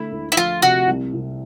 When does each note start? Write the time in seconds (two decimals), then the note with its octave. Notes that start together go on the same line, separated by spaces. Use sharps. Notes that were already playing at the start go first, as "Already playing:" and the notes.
Already playing: D3 A3 E4
0.12 D2
0.32 E4
0.37 F3 F4
0.62 C3 F#4
0.87 C2
1.13 C2